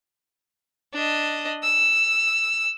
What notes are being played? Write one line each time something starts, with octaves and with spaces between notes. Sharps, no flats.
D4 D#5
E6